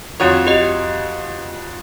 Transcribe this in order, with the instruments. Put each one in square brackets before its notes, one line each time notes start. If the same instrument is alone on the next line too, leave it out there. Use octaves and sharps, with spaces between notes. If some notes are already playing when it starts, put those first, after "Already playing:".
[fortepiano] F2 F#4 C#5
[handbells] G4 D#5